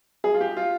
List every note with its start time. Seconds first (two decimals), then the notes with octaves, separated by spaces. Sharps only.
0.24 G#4
0.34 F4
0.41 G4
0.57 F4